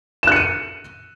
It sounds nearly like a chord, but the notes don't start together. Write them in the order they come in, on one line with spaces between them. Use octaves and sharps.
E7 F#6 C#7 D#7